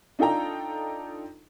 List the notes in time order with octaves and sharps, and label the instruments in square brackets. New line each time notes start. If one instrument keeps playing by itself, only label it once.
[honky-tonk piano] D4 D#4 F4 A4 G5 A#5